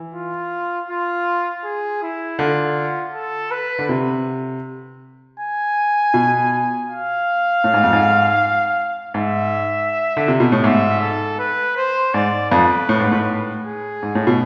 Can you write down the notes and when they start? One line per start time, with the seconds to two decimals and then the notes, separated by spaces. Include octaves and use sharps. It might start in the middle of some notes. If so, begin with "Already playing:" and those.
Already playing: E3
0.14 F4
0.89 F4
1.64 G#4
2.02 E4
2.39 D3 F4
3.14 A4
3.51 B4
3.79 D3
3.89 C3
5.39 G#5
6.14 B2
6.89 F5
7.64 A2
7.74 G#2
7.84 F2
7.93 G#2
9.13 G#2 E5
10.17 D3
10.28 C3
10.40 B2
10.52 A2
10.64 G#2 E5
11.01 A4
11.39 B4
11.77 C5
12.14 G#2 D5
12.51 F2 B4
12.89 A2
13.00 G#2
13.12 A2
13.64 G#4
14.03 G#2
14.15 A2
14.27 B2